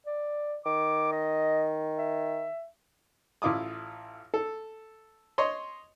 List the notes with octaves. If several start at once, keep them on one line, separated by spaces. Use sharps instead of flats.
D5
D#3 D6
D#5
E5
A1 E4 F4 D6 D#6
A4
C#5 D#5 C6